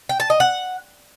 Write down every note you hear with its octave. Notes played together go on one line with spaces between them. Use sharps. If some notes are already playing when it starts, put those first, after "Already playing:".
G5
A5
D#5
F#5